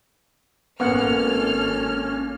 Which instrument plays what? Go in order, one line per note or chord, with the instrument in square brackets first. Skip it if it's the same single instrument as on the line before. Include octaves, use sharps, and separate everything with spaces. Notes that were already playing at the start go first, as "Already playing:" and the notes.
[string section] G#1 A4 F6 [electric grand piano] A#3 [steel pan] B3 F#5 [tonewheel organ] C#4